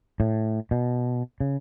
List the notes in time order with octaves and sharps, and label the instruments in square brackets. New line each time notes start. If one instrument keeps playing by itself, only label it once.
[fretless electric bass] A2
B2
C#3